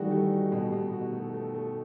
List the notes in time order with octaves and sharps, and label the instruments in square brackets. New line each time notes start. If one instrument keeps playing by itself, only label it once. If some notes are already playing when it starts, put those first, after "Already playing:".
Already playing: [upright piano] D#3 E3 G3 [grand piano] A3 D#4 F#4
[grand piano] A3
F#4
B2
B2
F#4
A3
A3
A3